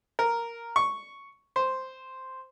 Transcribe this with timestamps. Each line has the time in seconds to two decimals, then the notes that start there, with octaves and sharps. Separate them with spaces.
0.19 A#4
0.76 C#6
1.56 C5